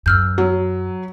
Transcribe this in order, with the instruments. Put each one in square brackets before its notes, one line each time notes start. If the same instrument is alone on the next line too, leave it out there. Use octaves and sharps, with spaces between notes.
[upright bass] F#2 [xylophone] E6 F6 G6
[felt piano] F#3